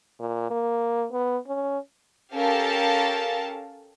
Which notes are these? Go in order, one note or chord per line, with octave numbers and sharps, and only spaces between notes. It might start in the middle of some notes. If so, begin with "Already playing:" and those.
A#2
A#3
B3
C#4
C#4 G4 A4 A#4 F5 A5